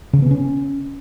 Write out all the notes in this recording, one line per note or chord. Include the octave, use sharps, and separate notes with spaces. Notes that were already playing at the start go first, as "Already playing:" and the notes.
C#3
B3
C#4